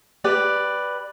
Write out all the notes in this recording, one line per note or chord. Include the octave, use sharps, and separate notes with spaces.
G4 B4 D5